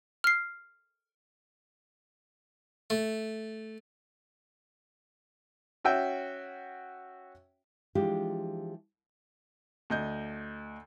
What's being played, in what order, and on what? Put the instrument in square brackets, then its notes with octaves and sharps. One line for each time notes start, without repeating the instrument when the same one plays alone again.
[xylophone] F6 C7
[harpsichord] A3
[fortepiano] C#4 F#4 E5 G5
[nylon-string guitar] E3 F3 G#3 D4 F4 G4
[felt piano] D2 D#5 G6